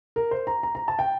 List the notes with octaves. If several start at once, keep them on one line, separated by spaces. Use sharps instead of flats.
A#4
C5
A#5
A#5
A#5
A5
G5